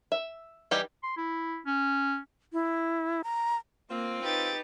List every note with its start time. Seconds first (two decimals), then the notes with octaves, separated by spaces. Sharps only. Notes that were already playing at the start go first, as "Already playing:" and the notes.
0.12 E5
0.71 E3 G3 D#4 G4
1.03 C6
1.17 E4
1.66 C#4
2.53 E4
3.24 A#5
3.90 A#3 C4 F4
4.23 D#4 G4 B4 G5 A6